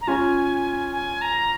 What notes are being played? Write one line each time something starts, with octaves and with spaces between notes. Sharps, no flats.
A#5
C#4 F4 G#5
G#5
A#5